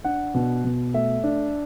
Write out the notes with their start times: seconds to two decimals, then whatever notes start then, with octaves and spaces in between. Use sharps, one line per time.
0.04 D4 F#5
0.34 B2
0.65 B2
0.94 A3 E5
1.24 D4